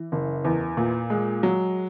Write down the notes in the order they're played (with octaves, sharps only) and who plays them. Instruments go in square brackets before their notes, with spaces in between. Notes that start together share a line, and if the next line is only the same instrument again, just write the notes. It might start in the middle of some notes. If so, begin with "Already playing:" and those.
Already playing: [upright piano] E3
F#1
E2
A#2
G#3
F#3